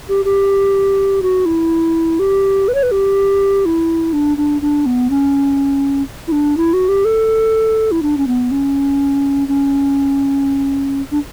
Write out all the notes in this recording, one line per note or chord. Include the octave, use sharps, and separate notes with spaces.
G4
G4
F#4
E4
G4
B4
C#5
B4
G4
E4
D4
D4
D4
B3
C#4
E4
D4
E4
F#4
G4
A4
E4
D4
C#4
B3
C#4
C#4
D4